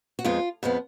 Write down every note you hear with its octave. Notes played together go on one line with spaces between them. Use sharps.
F#4
F2 F3 G#3 B3 F4
F2 F3 G#3 B3